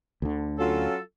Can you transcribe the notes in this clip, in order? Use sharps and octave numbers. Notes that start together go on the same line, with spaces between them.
D2 D3
F#3 C#4 F4 A4